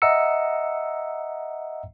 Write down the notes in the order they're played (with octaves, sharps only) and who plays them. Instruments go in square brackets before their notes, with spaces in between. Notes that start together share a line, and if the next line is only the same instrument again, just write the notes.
[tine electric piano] D#5 E5 F#5 A#5 E6 C#7